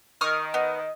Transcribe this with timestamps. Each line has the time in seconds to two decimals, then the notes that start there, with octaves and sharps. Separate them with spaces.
0.21 D#3 C#6 D#6 F6
0.54 B3 D#5